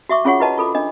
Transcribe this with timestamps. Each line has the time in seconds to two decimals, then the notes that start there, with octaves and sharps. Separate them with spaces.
0.09 F#4 E5 C#6 D6
0.25 C#4 F4 G#4 C#5 F#5 C#6
0.40 E4 F#4 B4 D#5 A5
0.58 F4 A4 B5 D6
0.75 D4 D#5